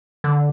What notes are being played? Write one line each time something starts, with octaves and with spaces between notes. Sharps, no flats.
D3